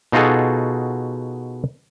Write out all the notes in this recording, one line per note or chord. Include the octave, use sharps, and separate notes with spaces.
B2 D#4 F4 F#4 G#4 A4